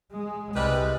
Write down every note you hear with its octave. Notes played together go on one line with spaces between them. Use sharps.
G#3
C2 C3 G3 G#3 B4